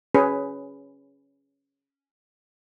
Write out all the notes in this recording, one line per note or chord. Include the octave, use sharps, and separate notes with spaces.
C#4 G#4 B4